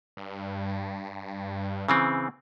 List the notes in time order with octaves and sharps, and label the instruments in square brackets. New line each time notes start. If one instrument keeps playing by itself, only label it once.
[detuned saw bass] G2
[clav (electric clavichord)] C#3 E3 C4